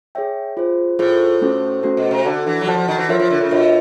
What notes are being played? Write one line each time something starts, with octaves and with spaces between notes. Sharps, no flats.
G#4 C#5 E5 G5
F4 G#4 C5
A2 F4 G#4 C5
A3 C#4 F#4 A4 C5
A3 C#4 F#4 A4 C5
B2
C3
D3 F#4 A4 D5 F#5 A5
E3
F#3
F3 F#4 A4 D5 F#5 A5
F3
D#3
E3
F3 F4 A#4 C#5 E5
F3
D3
C#3
B2 F4 A#4 C#5 E5